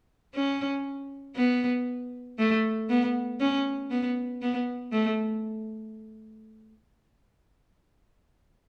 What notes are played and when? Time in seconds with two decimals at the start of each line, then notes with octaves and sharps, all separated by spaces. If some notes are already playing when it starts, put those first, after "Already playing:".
0.35 C#4
1.36 B3
2.39 A3
2.89 B3
3.40 C#4
3.91 B3
4.42 B3
4.92 A3